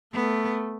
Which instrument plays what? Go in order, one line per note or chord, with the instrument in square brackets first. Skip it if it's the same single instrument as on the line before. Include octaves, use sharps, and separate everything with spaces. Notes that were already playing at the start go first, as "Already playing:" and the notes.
[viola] A3 [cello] B3